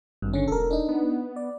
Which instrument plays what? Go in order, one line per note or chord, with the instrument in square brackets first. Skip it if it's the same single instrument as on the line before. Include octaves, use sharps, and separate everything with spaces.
[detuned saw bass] G#1 [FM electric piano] G2
[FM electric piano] D3 C#4
[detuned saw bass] E1 [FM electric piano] A4 A#4
[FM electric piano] D4 D#4
[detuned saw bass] B3
[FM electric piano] D5